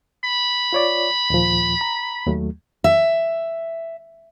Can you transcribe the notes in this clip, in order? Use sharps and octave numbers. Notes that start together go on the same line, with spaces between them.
B5
F4 C#5 D5
D#2 A#2 F3
A#5
D#2 F#3 A3
E5